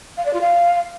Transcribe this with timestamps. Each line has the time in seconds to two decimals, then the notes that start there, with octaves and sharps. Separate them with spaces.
0.17 F5
0.25 D5
0.33 F4
0.41 F5